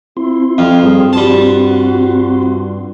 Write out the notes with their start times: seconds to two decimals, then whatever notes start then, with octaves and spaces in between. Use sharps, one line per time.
0.17 C4 E4 F4 C6
0.58 F2 F5 G5
0.83 G2 G#4
1.13 G3 F#4 A5